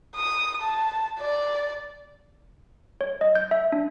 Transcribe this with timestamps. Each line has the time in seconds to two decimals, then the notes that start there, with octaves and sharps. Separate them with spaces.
0.16 D#6
0.62 A5
1.20 D5
3.01 C#5
3.21 D#5
3.35 G6
3.51 E5
3.72 D4